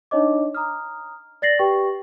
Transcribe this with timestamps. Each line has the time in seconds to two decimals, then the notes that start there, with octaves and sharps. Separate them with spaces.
0.11 D4 D#4 C#5 D#5 D6
0.54 A#5 D#6 F6
1.42 D5 A6 A#6 C7 F#7
1.59 G4 B4 G5 C#6